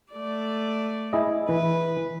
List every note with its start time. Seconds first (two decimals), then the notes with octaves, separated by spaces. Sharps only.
0.13 A3 D5
1.13 E4 G#4 D#5
1.49 E3 B4